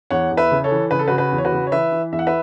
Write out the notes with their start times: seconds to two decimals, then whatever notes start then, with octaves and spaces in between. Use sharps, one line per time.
0.11 E2 C#5 F#5
0.31 E2
0.37 B4 E5
0.51 C#3
0.64 A4 C#5
0.71 E3
0.91 C#3 B4
0.99 A4
1.08 F#4 B4
1.11 C#3
1.18 F#4 B4
1.32 E2
1.38 C#5
1.44 F#4 B4
1.52 C#3
1.67 C#5
1.72 E3 B4 E5
1.92 E3
2.12 E2 E5
2.19 F#5
2.27 B4 E5